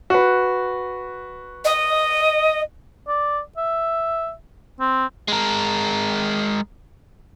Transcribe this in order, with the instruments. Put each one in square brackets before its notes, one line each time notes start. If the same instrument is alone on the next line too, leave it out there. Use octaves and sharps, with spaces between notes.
[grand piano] F#4 B4
[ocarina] D#5
[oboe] D5
E5
C4
[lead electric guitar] G#3 A#4